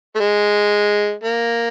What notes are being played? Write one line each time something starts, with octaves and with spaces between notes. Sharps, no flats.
A3
G#3
A#3